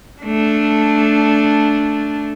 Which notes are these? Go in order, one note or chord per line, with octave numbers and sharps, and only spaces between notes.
A3 D4